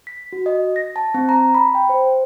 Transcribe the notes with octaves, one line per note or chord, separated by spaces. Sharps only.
B6
F#4
D#5
A#6
A5
C4
A#5
B5
G5
C5